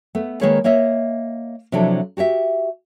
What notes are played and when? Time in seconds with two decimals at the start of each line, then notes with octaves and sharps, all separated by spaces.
0.15 A3 B3
0.41 D#3 G#3 A#3 G#4 B4 C#5
0.64 A#3 C#5 D#5 E5
1.72 C3 F3 F#3 D4 E4 A4
2.17 F#4 G4 C#5 E5